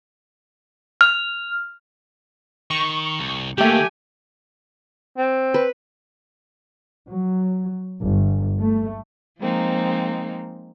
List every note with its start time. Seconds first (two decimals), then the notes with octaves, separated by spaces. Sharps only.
1.01 F6
2.70 D#3 C#6
3.19 C2
3.58 D#3 F#3 A3 A#3 G4 G5 G#5
5.18 C4
5.54 B4
7.08 F#3
8.03 G1
8.61 A3
9.40 F3 G#3 A#3 C4 D#4